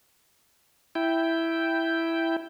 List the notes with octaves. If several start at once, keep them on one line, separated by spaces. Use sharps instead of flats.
E4 G5